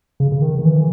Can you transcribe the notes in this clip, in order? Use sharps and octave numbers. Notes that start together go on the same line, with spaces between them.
C#3
C#3
D#3
D#3
E3